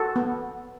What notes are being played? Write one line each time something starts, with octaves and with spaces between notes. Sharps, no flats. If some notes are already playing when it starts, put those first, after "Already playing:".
Already playing: F#4 A4
B3